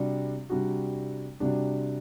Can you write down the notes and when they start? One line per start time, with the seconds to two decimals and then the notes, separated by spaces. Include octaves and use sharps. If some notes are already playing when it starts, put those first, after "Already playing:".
Already playing: C3 G3 D4 F#4
0.49 C3 G3 D4 F#4
1.40 C3 G3 D4 F#4